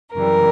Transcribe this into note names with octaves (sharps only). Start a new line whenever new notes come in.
F#2 C#3 E3 G3 A#4